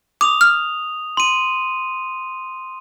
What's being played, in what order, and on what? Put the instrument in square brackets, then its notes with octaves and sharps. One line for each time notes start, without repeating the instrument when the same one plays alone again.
[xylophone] D6 [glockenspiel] D#6 F7
[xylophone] F6
[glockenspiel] C6 D#7